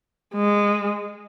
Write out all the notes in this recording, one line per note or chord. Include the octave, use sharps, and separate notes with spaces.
G#3